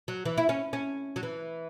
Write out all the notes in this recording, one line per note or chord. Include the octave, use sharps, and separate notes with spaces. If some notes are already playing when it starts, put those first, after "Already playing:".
F#3
E3
E4
C#4
C#4
F#3
E3